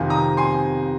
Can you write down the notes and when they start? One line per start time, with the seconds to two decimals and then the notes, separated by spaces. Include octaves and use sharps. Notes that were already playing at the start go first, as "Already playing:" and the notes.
Already playing: F2 C3 D#3 C4 F4 G#5
0.10 A#5 D#6
0.37 G#5 C6